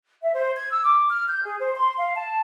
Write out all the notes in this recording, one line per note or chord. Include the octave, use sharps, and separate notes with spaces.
E5
C5
G#6
E6
D6
F6
G6
G#4
C5
C6
F5
A5